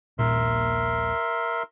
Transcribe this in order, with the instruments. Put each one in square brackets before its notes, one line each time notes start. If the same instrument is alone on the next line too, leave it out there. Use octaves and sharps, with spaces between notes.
[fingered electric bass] D#1 A#1 A#2 [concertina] A#4 E5 C6